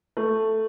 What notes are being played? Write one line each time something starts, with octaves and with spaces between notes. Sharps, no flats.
A3